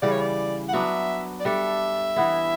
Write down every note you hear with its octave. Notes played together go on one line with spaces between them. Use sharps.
C#3 E3 G3 D5
C#5
D5
F#5
F#3 B3 D4 E5
D5
G3 D4 A4 E5
E3 B3 E4